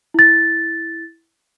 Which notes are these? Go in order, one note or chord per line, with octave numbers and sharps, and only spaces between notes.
E4 A6